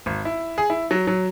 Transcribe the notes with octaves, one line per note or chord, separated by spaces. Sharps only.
G#1
E4
G#4
E4
F#3
F#3